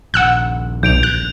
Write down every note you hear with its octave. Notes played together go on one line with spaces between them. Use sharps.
D#1 A#1 F#5 E6 F#6
B1 G6 D7 F7
F#6